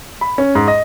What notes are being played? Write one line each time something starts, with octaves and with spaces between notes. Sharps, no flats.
B5
C#4
G#2
D#5